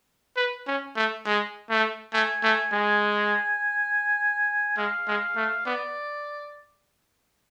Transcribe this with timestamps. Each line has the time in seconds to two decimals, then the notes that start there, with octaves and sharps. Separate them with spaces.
0.36 B4
0.67 C#4
0.96 A3
1.26 G#3
1.70 A3
2.13 A3 G#5
2.43 A3
2.72 G#3
4.77 G#3 F5
5.08 G#3
5.36 A3
5.66 B3 D5